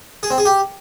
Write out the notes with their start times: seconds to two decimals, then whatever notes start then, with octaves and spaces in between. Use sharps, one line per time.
0.23 G#4
0.30 C4
0.38 G#4
0.45 G4